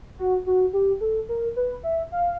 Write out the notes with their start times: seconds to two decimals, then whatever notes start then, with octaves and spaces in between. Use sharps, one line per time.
0.19 F#4
0.46 F#4
0.73 G4
1.01 A4
1.29 A#4
1.56 B4
1.83 E5
2.12 F5